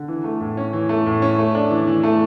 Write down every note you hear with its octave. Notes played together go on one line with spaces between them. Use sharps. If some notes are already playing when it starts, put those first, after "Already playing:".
Already playing: D3
E3
A3
A2
C#4
E3
A3
A2
C#4
A3
D4
E3
E3
A3